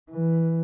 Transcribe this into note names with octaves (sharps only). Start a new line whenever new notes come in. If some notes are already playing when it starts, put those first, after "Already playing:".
E3